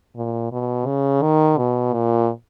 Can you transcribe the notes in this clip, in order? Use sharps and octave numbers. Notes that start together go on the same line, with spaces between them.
A#2
B2
C#3
D#3
B2
A#2